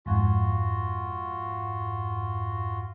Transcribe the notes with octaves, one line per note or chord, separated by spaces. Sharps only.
F2 G#2 F4 F#4